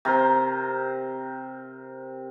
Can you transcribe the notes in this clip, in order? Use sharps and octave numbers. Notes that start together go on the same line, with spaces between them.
C3 A#4 C5